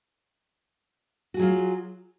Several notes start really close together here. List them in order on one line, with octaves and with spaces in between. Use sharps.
F#4 G#4 F#3 F4